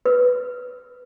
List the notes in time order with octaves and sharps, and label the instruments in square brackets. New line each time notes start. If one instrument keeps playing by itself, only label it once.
[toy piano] B4